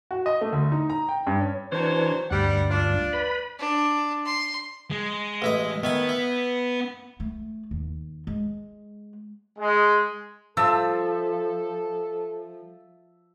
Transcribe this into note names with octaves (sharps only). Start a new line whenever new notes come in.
F#4
D#5
A3
D2
D#4
A#5
G5
G2
C#4
E3 F#3 C4 D4 C5 C#5
D2 G2 G3 F#5
D4 F4
B4 B5
D4
C6
G#3
A1 E4 D#5
D#3 B3 E5 G#5
E4
A3
D#2
G#3
G#3
F3 A4 E5 A5 E6